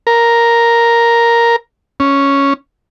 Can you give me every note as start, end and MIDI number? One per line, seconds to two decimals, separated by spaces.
0.07 1.56 70
2.00 2.53 61